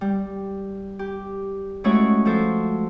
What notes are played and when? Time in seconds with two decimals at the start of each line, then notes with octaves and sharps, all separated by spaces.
0.01 G3
0.99 G4
1.84 G#3 A3 C#4 E4 F#4 C#5
2.25 F3 F#4 A4 C5